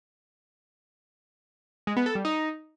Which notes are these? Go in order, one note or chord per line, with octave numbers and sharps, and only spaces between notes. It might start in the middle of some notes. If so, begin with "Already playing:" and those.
G#3
B3
A4
G3
D#4